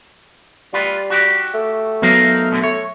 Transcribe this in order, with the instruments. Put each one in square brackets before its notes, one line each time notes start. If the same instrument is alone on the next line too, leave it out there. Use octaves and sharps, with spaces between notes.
[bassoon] G3 [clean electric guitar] F4 B4
[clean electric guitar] F#4 G4 D5
[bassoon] A3
[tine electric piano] F#3 B3 [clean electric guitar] D#4 A#4 F5
[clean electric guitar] D2 B2 D3
[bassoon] A3 [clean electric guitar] C#5